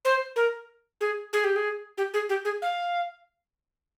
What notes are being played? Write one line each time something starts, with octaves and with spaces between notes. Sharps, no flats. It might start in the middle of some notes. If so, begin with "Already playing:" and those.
C5
A#4
G#4
G#4
G4
G#4
G4
G#4
G4
G#4
F5